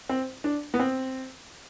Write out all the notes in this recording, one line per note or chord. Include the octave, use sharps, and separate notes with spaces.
C4
D4
B3
C4